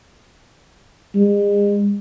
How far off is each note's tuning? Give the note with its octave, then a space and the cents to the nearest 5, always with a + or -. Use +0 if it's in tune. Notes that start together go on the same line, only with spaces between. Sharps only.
G#3 -40